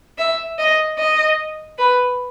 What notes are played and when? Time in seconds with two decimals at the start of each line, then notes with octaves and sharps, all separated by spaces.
0.18 E5
0.58 D#5
0.98 D#5
1.78 B4